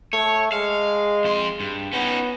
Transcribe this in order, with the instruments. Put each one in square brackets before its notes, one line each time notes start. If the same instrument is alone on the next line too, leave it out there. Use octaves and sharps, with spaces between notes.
[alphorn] A3 [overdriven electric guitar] C#5
[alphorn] G#3 [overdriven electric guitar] F5
[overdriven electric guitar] F2 C6
G2
[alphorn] B3 [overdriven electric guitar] C#4 D#4